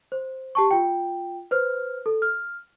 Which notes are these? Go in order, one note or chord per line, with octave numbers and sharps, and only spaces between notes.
C5
G4 A5 C#6
F4 G5
B4 C5 F6
A4
F6